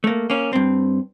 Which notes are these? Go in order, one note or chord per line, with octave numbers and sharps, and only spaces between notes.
A3 A#3
A#3 C#4
G2 C4